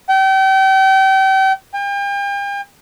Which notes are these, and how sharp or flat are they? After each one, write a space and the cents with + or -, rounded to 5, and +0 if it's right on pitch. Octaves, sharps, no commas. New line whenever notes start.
G5 -35
G5 +40